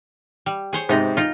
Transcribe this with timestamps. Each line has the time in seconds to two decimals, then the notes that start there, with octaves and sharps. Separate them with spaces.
0.46 G3
0.73 G#4 C5 C#5
0.89 G#2 C3 B3 D#4
1.17 D#4 F4